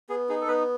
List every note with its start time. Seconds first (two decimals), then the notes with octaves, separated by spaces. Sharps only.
0.09 B3 G#4
0.29 D#4 G#4
0.41 A4
0.48 B3 B4